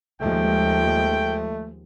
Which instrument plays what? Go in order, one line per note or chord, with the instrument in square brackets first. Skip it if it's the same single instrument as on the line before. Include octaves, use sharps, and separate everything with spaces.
[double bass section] D#2 F3 G#3 [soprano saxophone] A3 [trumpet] G5